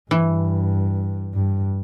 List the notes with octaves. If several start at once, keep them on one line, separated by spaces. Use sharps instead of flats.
G2 E3
G2